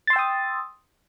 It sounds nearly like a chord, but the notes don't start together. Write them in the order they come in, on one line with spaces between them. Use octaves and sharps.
A6 C6 E6 G5 D#6